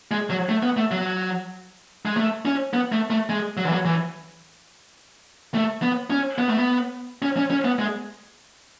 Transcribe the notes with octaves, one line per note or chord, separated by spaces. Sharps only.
G#3
F#3
A3
B3
A3
F#3
G#3
A3
C#4
B3
A3
A3
G#3
F#3
E3
F#3
E3
A3
B3
C#4
B3
A3
B3
C#4
C#4
C#4
B3
G#3